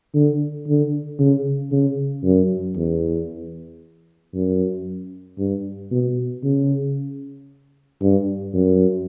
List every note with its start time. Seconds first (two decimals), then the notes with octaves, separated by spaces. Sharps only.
0.14 D3
0.67 D3
1.19 C#3
1.72 C#3
2.24 F#2
2.76 E2
4.34 F#2
5.38 G2
5.91 B2
6.44 C#3
8.01 G2
8.54 F#2